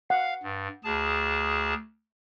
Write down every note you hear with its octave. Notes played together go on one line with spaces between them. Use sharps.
F5 F#5
G2
D2 G#4 A5